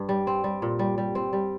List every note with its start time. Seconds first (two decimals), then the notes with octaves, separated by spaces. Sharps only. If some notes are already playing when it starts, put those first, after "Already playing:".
Already playing: G2
0.09 G3
0.27 C4
0.44 G3
0.62 A#2
0.79 G3
0.98 G3
1.15 C4
1.33 G3